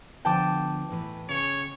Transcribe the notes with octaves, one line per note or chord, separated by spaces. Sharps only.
D3 F3 B3 G5 A5 D6
A2 E3 B4
C#3 C#5